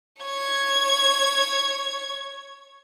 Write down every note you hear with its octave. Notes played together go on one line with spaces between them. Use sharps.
C#5 G#6